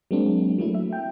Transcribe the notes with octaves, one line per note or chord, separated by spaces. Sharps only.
F#3 G#3 A#3 C4 D4
F#3 A3 E4
E5
G5